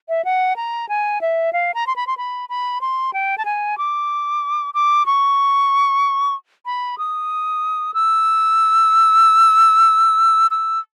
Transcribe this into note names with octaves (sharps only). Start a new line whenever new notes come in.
E5
F#5
A#5
G#5
E5
F5
A#5
C6
B5
C6
B5
B5
C6
G5
A5
G#5
D6
D6
C#6
B5
D#6
E6
E6